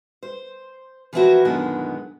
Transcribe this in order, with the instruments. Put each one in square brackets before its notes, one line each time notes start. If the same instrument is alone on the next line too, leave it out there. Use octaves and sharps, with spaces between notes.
[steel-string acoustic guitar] C5
E3 F3 A#3 C4 E4 F#4
F#2 A#2 D3 D#3 G#3 B3